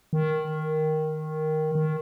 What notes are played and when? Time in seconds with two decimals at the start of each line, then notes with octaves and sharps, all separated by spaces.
0.13 D#3
1.75 D#3